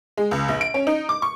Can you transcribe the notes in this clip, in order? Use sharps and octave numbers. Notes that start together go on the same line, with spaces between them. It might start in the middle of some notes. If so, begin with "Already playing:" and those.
G#3
C#2
A#1
D7
C#4
D#4
D6
C#6